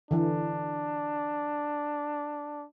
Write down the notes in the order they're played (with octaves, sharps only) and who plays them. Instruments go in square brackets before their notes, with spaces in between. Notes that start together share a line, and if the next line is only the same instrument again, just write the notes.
[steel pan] D3 E3 [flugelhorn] D4